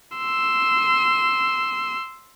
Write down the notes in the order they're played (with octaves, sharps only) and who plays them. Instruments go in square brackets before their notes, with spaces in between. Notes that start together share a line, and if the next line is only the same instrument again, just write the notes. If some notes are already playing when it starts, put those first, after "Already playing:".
[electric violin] C6 E6